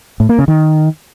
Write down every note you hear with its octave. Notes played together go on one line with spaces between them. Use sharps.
A2
A#3
C#3
D#3